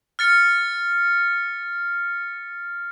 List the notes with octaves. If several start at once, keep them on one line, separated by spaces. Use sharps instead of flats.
F6 A6 C#7